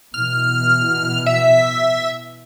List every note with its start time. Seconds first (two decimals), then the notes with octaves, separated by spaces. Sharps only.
0.14 B2 E3 F6
1.26 E5